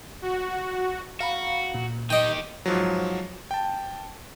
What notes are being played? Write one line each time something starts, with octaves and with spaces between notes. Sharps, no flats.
F#4
F#4 F5 A#5 B5
A#2
D#3 G4 D#5 G5
G#2 F3 F#3
G5 A5